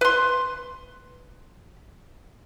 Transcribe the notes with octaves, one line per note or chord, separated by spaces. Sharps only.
B4 C6